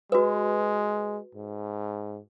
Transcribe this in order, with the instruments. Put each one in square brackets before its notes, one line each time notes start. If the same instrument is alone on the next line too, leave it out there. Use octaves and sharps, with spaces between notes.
[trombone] G#3 [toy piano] F#4 B4
[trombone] G#2